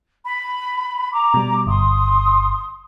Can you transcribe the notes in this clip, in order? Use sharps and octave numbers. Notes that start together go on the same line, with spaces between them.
B5
A#5 D6
B2 G3
G1 C6 D#6